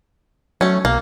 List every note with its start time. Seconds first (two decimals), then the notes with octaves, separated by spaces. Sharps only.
0.61 F#3 A3 C#4
0.85 B1 A#3